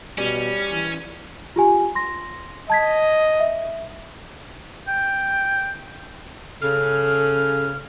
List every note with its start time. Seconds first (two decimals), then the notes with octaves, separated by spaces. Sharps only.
0.18 B2 G3 C#4
0.71 E3
1.56 F4 G4 G#5
1.95 C6 A#6
2.70 D#5 A5 G#6 B6
3.40 E5
4.88 G5
6.62 C#3 A4 F6